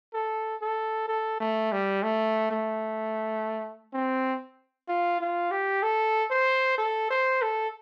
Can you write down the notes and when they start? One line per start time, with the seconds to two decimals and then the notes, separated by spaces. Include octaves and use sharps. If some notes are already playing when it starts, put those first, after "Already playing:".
0.14 A4
0.62 A4
1.08 A4
1.40 A3
1.72 G3
2.03 A3
2.51 A3
3.93 C4
4.88 F4
5.20 F4
5.51 G4
5.83 A4
6.31 C5
6.78 A4
7.10 C5
7.42 A4